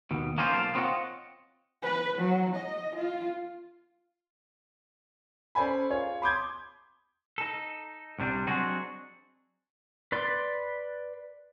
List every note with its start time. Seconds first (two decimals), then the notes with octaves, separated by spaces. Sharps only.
0.11 D#2 B2
0.38 A#3 C#4 D#4 F4 G#4 C5
0.52 B1 A#3 F5 A5
0.74 B3 C4 F4 C#5 D#5 F#5
1.83 B4
2.19 F#3
2.57 D#5
2.97 F4
5.55 C#4 A4 C5 D5 G#5 B5
5.90 F4 G#4 C#5
6.22 B5 C6 D6 D#6 G6 G#6
7.38 D#4 A4
8.19 C2 C3 G3 D4
8.47 F#3 C4 D4 F#4 G#4 D#5
10.12 B4 D5 C6